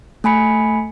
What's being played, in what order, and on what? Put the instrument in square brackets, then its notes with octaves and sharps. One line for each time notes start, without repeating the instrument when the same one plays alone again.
[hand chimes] A3 G#5 B5 C#7